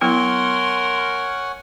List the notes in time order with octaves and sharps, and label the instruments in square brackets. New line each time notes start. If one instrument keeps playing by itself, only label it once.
[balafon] F#3 B3 E4 [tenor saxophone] A#4 [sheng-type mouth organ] C#5 F#5 G#5 [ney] C6